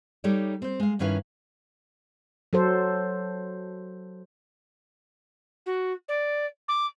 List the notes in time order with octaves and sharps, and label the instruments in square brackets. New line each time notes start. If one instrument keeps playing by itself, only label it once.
[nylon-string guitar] G3 D#4 G4 A4 C#5 D5
C4 C5
G#3 F5
G2 D#3 C#4 E4 B4 F5
[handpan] F#3 A4 C5
[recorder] F#4
D5
D6